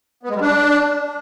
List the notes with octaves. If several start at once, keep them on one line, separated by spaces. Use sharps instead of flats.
B3
G#3
G3
D4